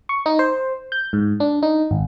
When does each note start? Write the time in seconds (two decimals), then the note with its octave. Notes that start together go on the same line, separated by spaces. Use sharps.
0.09 C#6
0.26 D#4
0.39 C5
0.92 G6
1.13 G#2
1.40 D4
1.63 D#4
1.91 G#1